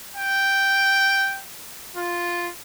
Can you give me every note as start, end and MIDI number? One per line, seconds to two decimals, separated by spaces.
0.17 1.39 79
1.96 2.48 65